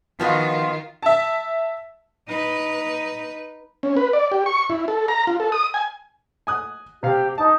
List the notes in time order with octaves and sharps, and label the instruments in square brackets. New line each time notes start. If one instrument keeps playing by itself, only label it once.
[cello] D#3 [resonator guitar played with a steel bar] F3 B3 F#4 [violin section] F4
[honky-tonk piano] E5 A5
[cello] D#4 B4
[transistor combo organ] C#4
B4
D5
G4
C#6
E4
A4
A#5
F4
A4
D#6
G#5
[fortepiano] G#5 D#6 F#6
[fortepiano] C3 F5 [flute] G4
[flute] D#4 [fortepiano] A5